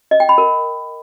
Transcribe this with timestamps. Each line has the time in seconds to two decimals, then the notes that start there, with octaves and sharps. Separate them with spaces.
0.11 D#5
0.20 G5
0.29 B5
0.38 A#4